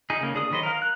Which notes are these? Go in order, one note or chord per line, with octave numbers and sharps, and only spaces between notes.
D#4 G#4
C#3 A#3
D4 G#4 D#6
D#3 F#3 B4 C5 D#5
A#4 F5
F#6